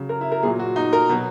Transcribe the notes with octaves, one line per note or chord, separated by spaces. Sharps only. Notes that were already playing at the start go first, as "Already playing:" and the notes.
Already playing: C#3 F#3
A#4
E4
A#4
A#2 F#3 G#4
F#4
D#4
A#4
B2 F#3